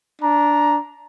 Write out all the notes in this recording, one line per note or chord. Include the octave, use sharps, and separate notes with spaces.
D4 A#5